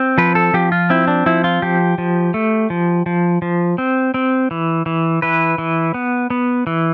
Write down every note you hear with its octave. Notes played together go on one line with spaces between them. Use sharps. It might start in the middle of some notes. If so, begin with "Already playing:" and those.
Already playing: C4
F3 B4
A4
F3 G4
F4
C4 E4
D4
F3 E4
F4
F3 G4
F3
A3
F3
F3
F3
C4
C4
E3
E3
E3 B4
E3
B3
B3
E3